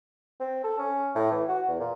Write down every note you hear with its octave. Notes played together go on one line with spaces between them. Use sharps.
C4
A4
C#4
A2
E3
F#4
E2
A#2